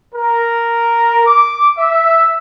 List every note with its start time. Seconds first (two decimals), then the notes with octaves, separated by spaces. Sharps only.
0.15 A#4
1.27 D6
1.78 E5